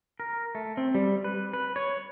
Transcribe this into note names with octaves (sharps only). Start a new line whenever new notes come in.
A#4
A3
C4
G3
B4
B4
C#5